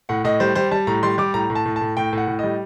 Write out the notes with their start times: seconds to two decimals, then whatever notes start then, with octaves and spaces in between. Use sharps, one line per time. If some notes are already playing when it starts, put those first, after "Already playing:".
0.09 A2 F#5
0.24 A2 D#5
0.40 G3 C5
0.55 G3 C5
0.71 G3 A5
0.87 A2 A#5
1.03 G3 C6
1.18 G3 D6
1.34 A2 A#5
1.50 A2
1.55 A5
1.65 A2
1.76 A5
1.81 A2
1.97 A2 G5
2.13 A2 F#5
2.27 A2
2.39 G3 D#5